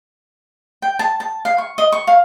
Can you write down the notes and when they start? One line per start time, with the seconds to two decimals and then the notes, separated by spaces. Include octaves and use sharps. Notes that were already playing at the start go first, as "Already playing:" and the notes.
0.82 G5
0.99 A5
1.20 A5
1.45 F5
1.58 C#6
1.78 D#5
1.92 C#6
2.07 F5